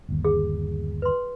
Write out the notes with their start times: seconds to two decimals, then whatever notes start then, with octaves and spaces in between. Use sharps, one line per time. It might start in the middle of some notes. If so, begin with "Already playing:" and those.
0.09 G1 D#2
0.25 G#4
1.02 B4 C6